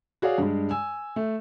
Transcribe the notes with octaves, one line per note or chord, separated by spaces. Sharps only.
F#4 G#4 C#5 D5 F5
G2 G#3
G#5 E6
A3